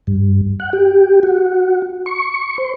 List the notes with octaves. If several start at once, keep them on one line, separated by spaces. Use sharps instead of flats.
G2
F#5
G4
F#4
C#6
C5